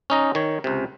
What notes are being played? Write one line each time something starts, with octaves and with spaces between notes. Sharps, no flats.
C#4 D#4 A#5
D#3 C#5
C#2 C3